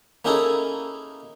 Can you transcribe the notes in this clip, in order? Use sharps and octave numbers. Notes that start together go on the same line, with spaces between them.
A#3 C#4 D#4 E4 G#4 A4